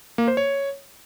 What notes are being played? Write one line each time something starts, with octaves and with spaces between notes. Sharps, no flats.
A#3
C5
C#5